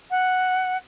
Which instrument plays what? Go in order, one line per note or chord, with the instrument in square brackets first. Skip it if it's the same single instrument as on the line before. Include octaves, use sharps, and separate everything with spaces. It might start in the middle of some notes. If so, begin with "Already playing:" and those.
[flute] F#5